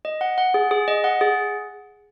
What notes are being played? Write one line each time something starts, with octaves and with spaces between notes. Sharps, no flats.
D#5
F#5
F#5
G#4
G#4
D#5
F#5
G#4